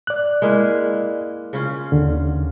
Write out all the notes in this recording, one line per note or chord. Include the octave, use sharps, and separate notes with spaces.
D5 F#6
G#3 A#3 E4
C#3 C#4 F4
D#2 D3